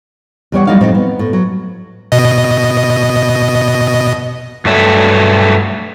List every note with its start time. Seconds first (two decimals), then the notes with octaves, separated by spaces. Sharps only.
0.52 E2 G3 C#5 F#5
0.67 F#3 G3 D#4 E4 F5
0.81 F2 A2 F3 C4 D#4
0.95 B3
1.19 A2
1.33 F#3
2.12 B2 D#5
4.65 G2 F#3 A3 E5